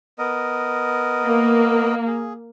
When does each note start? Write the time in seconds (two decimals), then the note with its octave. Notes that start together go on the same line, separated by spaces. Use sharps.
0.19 B3 A#4 D#5
1.26 A#3
2.07 G#4